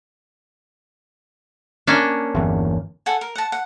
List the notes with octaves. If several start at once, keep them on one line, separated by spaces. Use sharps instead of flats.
A#3 C#4 D4
G1 E2
A4 F#5 G#5
A#4
F#5 A5
F#5